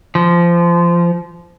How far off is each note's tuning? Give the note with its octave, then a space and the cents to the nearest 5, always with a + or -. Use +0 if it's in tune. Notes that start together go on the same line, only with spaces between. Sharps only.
F3 -20